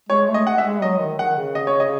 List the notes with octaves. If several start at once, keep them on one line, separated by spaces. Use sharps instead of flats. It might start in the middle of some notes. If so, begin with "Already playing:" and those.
G#3 C#5
A3
D#5
F#5
E5
G#3
F#3 D#5
D#3
D#3 F#5
C#3
D#5
C#5
D#5